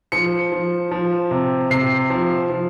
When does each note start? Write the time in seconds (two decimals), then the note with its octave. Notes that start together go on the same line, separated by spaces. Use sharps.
0.12 F3 C#7
0.52 F3
0.91 F3
1.31 C3
1.70 C3 C7
2.10 F3
2.50 F3